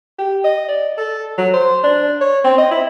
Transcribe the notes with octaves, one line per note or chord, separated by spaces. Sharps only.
G4
D#5
D5
A4
F#3
C5
D4
C#5
C4
D#5
E4